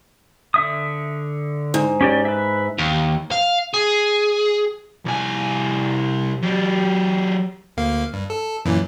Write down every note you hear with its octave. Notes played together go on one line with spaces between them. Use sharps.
D3 E5 D#6
G#2
C#4 G4 D5
B4 E5
D#2
F5
G#4
C2 G#5
F#3 G4
D2 A#3 F5
G2
A4
F#2 A#2 E3